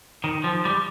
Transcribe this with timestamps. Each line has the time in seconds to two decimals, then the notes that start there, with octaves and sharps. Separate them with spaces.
0.24 D#3
0.44 F3
0.65 G3